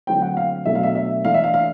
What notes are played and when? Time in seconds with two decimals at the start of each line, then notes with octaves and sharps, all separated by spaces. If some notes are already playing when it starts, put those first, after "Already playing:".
0.07 D3 F#3 A3 C4 E4 G5
0.22 F#5
0.37 F5
0.66 B2 F#3 A3 D4 E5
0.75 F5
0.83 E5
0.95 E5
1.24 E3 A3 D4 F5
1.34 E5
1.44 F5
1.54 F5